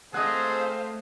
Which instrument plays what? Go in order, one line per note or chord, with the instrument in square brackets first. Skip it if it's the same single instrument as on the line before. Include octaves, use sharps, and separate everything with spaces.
[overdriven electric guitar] A3 [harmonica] C4 G#4 A5 [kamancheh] C5 F5 [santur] D#5 F#5